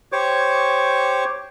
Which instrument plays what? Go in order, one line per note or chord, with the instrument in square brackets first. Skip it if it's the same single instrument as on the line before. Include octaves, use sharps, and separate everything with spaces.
[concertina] G4 C5 C#5 C#6 D6